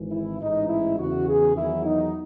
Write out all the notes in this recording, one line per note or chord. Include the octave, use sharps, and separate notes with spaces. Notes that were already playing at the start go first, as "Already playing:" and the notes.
Already playing: G#1 G#2 E3
E4
A1 G#2 E3 D#4
E4
E2 C#3 E3 F#4
G#4
E2 D#3 F#3 E4
D#4